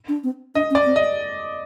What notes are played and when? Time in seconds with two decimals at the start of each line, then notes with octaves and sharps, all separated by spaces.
0.08 D4
0.24 C4
0.55 D4 D#5
0.70 C#4
0.75 D5
0.86 C4
0.96 D#5